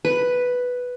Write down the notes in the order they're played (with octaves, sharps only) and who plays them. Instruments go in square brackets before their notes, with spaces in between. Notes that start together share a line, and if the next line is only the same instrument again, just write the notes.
[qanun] B4